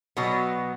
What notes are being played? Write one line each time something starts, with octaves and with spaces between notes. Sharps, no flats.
B2 F#3 B3